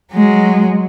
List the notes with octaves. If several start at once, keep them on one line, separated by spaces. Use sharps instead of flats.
F#3 G#3